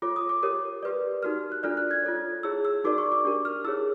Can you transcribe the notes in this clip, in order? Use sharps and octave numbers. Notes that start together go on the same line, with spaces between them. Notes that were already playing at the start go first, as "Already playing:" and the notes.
F4 A4 C#5 D6
D#6
D6
G4 A#4 C#5 D#6
G4 B4 D5
D#4 F#4 A#4 F6
F#6
D4 F4 A4 D5 F6
F#6
G#6
F4 A4 C#5
E4 G#4 C#5 E6
E6
D#4 F#4 A#4 D5 D6
C#6
D6
D4 G4 A#4
F6
E4 G#4 C#5 E6